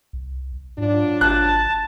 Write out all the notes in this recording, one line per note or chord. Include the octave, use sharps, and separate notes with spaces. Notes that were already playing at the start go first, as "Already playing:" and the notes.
C2
G#2 F#3 D4 F4
G#1 A5 F#6